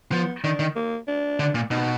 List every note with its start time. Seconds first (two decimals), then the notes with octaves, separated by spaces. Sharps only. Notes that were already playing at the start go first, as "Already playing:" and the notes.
0.12 F3 B3
0.44 D#3 D4
0.59 D#3
0.76 A#3
1.08 D4
1.40 D3
1.55 A#2
1.71 B2 D#4